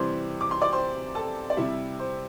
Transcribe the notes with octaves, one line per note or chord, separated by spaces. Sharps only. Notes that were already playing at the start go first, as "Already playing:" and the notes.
Already playing: C3 E3 G3 C5 C6
D6
C6
D5 D6
C5 C6
A4 A5
D5
C3 G3 E4 E5
C5